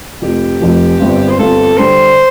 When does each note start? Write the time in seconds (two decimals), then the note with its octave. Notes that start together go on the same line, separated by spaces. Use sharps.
0.22 F1 F2 F3 G4
0.60 F1 F2 F3
1.00 G1 G2 G3 C4 F4
1.29 C5
1.38 G1 G2 G3 C4 F4 A4
1.77 D3 G3 D4 C5